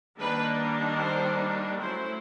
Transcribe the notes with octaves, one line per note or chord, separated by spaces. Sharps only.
D#3 G3 A#3 D4 B4
C5
F#3 A3 C#4 E4 C5